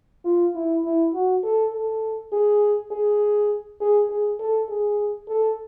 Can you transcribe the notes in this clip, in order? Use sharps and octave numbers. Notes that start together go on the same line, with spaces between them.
F4
E4
E4
F#4
A4
A4
G#4
G#4
G#4
G#4
A4
G#4
A4